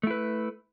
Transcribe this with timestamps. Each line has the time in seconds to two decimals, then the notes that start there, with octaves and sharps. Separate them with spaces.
0.03 A3
0.07 E4
0.11 B4